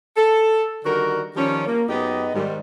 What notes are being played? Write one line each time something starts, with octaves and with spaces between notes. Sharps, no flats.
A4
D3 D#3 G3 F#4 A#4
D#3 F3 G3 C#4
A#3
F#2 B3 D#4 G4 G#4 D#5
G#2 D#3 G3